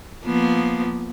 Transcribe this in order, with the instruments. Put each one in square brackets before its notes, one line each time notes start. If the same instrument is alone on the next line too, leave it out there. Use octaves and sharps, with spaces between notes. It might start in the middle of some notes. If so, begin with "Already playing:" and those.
[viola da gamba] F3 A#3 B3